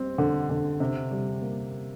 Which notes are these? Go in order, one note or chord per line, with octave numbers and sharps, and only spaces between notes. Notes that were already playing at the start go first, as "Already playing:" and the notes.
Already playing: G3 C4
D3
D3
C3
G3
A#3